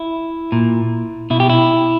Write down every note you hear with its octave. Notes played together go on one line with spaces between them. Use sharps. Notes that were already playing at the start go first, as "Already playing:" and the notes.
Already playing: E4
A#2
B2 E4
G4
E4